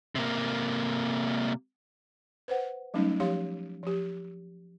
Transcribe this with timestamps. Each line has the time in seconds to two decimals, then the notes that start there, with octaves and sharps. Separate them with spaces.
0.15 C3 A#3
2.48 B4 C5 F#5
2.94 F#3 G3 A3 C#4 D#4
3.20 F3 G4 C#5 F5 C6
3.83 F3 G4